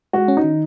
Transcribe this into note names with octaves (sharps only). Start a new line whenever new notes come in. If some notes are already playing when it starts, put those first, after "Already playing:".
G#3 F#4
C#4
D#4
D#3